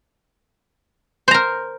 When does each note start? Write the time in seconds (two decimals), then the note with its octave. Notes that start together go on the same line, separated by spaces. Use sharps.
1.28 C5
1.31 A#5
1.34 A#4